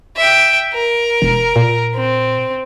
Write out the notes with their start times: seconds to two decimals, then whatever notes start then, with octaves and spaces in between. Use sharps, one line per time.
0.17 E5 G5
0.74 A#4
1.22 E1
1.56 A#2
1.95 C4